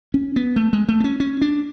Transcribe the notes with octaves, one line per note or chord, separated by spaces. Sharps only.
C#4
B3
A3
G#3
A3
B3
C#4
C#4
D4